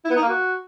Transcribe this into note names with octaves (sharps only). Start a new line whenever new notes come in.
E4
B3
D#4
A#3
F#4